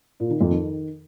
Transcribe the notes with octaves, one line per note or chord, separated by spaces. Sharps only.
A#2
D#3
F2
D#3